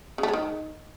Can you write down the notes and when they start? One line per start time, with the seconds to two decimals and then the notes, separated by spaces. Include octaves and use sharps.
0.18 C#3
0.23 A3
0.28 G#3
0.33 D#3